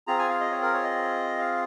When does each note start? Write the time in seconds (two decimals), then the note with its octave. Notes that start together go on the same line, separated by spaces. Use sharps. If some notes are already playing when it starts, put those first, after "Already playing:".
0.07 C4 F4 G#4 A#5
0.19 G#5
0.29 F5
0.40 D#5
0.51 C#5
0.62 A#4
0.73 C#5
0.84 D#5
1.38 F5